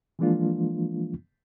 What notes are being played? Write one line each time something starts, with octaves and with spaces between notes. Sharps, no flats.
E3 F3 G#3 A#3 D4 F4